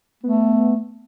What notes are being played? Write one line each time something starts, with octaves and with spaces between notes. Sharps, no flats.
A3 B3